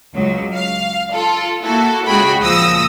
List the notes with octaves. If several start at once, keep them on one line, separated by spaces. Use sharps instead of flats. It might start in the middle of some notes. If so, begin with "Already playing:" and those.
C#2 F#3
F5
F4 A4
A#3 E4 F#4 A4
C#2 F#4 G#4 G5 B5
C#2 A#2 F3 D#6 E6 A#6